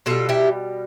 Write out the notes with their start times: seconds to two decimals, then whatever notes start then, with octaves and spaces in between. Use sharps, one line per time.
0.06 B2 G3 F4 A4
0.29 E4 G4